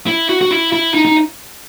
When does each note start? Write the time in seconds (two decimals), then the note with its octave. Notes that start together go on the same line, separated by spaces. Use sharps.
0.07 E4
0.29 F#4
0.41 F#4
0.51 E4
0.73 E4
0.94 D#4
1.05 D#4